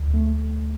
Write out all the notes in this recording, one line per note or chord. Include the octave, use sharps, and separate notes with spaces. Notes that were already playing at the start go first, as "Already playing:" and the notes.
Already playing: D2
A3